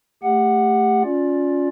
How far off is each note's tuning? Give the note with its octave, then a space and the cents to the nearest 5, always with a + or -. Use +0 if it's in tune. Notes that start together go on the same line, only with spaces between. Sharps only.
A3 +5 G4 +20 F#5 +0
C#4 +15 F4 +20 D5 +0